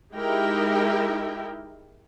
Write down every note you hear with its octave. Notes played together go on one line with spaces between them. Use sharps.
G#3 D#4 E4 G4 A#4 G5